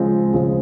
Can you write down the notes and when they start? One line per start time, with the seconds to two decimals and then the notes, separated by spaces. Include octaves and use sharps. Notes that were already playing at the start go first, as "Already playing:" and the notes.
Already playing: C#3 F3 G#3 C4
0.33 C#3 F3 G#3 C4